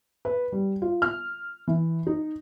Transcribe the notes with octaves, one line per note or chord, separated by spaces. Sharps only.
B4
G3
F4
F6
E3
D#4